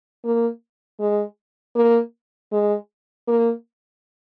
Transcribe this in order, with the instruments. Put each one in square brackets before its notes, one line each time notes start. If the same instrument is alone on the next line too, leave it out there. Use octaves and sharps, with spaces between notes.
[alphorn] A#3
G#3
A#3
G#3
A#3